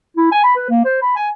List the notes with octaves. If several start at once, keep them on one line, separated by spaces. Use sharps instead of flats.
E4
G#5
B5
B4
A#3
C5
B5
G#5